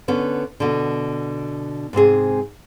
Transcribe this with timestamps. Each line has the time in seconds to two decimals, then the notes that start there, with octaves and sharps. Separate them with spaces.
0.08 D3 B3 C#4
0.60 B2 D3
1.93 G#2 C3 C4 G#4